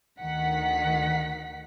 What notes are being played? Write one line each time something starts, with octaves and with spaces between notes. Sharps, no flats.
D2 D#3 F#5 B6